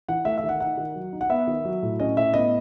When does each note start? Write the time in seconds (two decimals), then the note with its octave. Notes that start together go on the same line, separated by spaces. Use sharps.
0.08 E3 F#5
0.25 A3 E5
0.38 E5
0.43 D#3
0.49 F#5
0.60 D#4 F#5
0.77 D#3
0.95 F#3
1.13 D#4
1.21 F#5
1.29 B3 E5
1.47 D#3
1.65 F#3
1.83 A2
2.00 C#4 D#5
2.17 A2 E5
2.34 B3 D#5